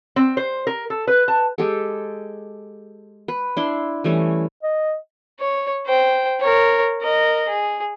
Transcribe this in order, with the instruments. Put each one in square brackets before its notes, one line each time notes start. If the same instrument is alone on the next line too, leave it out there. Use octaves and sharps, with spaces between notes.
[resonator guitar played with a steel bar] C4
C5
A#4
A4
B4
A5
[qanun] G#3 G4 A4
B4
D4 E4 C6
E3 G3 A3 C#4
[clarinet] D#5
[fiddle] C#5
C5 G5
A#4 C#5
A#4 D#5
G#4